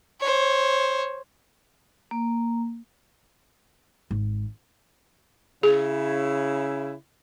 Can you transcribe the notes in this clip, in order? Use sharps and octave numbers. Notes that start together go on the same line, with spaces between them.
C5 C#5
A#3
G#1
C#3 E4 G#4